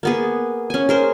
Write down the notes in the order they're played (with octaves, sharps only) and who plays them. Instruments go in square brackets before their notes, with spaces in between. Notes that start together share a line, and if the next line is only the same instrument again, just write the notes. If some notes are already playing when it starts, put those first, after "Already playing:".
[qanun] A#3 B3 G#4
C#4 G#5
G#4 A#4 C5